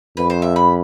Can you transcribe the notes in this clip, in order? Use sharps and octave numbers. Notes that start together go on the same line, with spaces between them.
F2 B4
C5
E5
B5